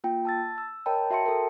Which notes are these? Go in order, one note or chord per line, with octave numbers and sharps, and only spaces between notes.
A#3 F4 G5
A5 E6 A6
E6
A#4 C#5 D#5 G5 A5 B5
F#4 E5 G5 A5 C6 C#7
A4 A#4